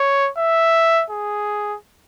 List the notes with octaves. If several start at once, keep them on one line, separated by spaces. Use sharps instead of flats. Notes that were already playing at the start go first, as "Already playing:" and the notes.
Already playing: C#5
E5
G#4